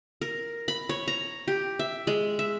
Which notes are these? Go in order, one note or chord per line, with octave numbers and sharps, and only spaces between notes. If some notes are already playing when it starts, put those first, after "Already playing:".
A#4
B5
C#5
A#5
G4
E5
G#3
E5